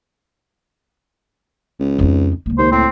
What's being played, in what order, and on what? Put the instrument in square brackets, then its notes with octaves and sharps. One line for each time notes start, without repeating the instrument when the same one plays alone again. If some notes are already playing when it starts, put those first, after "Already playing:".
[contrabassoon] C#2
[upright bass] F2 D#4
C#2 A#3
[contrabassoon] D#2 [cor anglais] C5
[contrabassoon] A2 [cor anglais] C4